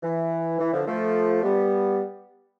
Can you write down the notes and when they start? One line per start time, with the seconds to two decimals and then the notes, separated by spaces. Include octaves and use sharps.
0.03 E3
0.59 E3
0.72 D3 F3
0.86 F3 A3
1.42 G3 B3